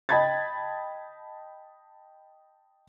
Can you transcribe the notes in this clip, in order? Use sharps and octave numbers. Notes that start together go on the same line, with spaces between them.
D#5 G5 A5 B5 G#6 A6